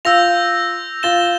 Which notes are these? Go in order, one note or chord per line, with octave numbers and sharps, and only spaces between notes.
F4 E6 G6 A#6 F7
F4 A6 E7 G7